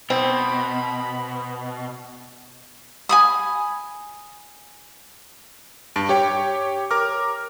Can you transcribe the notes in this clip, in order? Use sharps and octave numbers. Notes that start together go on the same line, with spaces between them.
B2 C4 B5
G#5 B5 D#6
G2 A5 D7
G4 C#5 G5
A#4 A#5 D6 F6